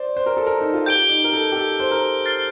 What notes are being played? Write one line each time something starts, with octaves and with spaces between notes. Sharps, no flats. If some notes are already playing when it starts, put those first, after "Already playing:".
Already playing: C5 D5
C5
A#4
A4
A#4
D#4
F4
G4 G6 D7 G7
D#4
A#4
A4
G4
A4
C5
A#4
F6 A6 C7